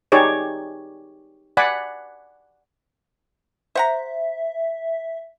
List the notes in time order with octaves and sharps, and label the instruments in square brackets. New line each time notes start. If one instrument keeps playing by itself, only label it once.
[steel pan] D#4 G4 G#4 C#5 D5
D5 F#5 G#5 B5
[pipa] C5 F#5 A#5 [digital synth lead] E5